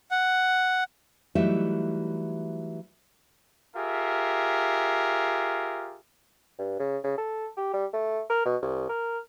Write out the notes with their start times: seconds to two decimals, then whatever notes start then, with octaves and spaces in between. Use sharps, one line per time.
0.11 F#5
1.35 E3 F#3 G3 A3 D#4 E4
3.75 F4 G4 G#4 A#4 E5
6.59 G2
6.79 C#3
7.04 C#3
7.17 A4
7.57 G4
7.74 G3
7.93 A3
8.30 A#4
8.46 B2
8.62 C2
8.89 A#4